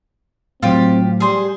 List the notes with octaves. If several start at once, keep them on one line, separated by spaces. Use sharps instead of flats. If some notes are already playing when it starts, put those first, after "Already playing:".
A2 F#3 C4 F4 G4
G3 G#4 C5